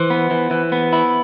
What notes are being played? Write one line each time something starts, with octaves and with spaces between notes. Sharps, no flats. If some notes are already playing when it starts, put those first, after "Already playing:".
Already playing: E3 C5
B3
E3
E3
B3
E4